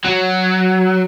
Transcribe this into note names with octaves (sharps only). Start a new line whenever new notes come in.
F#3